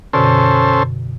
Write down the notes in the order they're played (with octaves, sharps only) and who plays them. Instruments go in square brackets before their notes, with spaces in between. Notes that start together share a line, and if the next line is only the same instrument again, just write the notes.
[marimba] F#2 B2 D3 [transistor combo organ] C#4 A4 C5